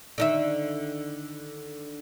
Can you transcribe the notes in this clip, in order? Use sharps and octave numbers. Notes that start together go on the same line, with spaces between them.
D3 D#3 E5